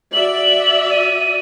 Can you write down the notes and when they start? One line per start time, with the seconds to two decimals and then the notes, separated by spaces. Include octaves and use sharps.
0.13 F#4 D5 E5 F#7
0.91 D#7